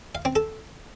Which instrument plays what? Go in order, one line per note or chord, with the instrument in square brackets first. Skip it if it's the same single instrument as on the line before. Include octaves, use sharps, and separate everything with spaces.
[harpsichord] F5
C4
A4